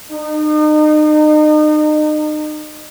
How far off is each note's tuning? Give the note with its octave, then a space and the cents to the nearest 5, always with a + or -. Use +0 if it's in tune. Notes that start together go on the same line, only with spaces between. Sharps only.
D#4 -35